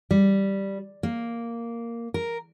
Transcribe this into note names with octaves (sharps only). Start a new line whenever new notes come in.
G3
A#3
A#4